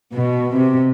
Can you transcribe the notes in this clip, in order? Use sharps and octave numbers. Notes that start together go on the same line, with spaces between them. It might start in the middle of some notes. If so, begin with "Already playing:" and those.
B2
C3